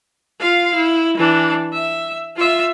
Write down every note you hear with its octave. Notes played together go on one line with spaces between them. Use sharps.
F4 F5
E4
E3 D4
E5
F4 E5